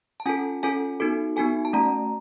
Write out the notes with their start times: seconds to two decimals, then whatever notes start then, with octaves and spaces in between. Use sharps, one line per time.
0.20 A5
0.26 C#4 F4 A4 G#5
0.63 C#4 F4 A4 G#5
1.00 B3 D#4 F#4 A4
1.36 B3 D#4 F#4 A4 G#5
1.65 A5
1.73 A3 C#4 F#4 A#5